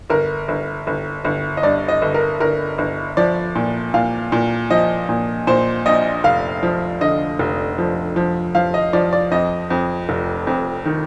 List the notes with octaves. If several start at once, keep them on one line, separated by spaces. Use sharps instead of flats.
G1 A#4
G1
G1
G1
D#5
G2 D5
D#5
G1
A#4
G1 A#4
G1
F3 D5
A#2
A#2 F5
A#2
F3 D#5
A#2
A#2 C5
A#1 D#5
F1 F5
F3
D3 D#5
F1
F3
F3
F3 F5
D#5
F3 D5
D5
F2 D#5
F2
F1
F2
D#3